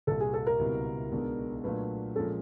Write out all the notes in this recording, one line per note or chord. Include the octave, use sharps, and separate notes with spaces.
C2 A#2 G3 A4
G#4
A4
A#4
C#2 B2 G3 C4 E4
B1 B2 G#3 B3 D4
A#2 F#3 A3 D4 F4 B4
A#2 F3 G#3 C#4 A4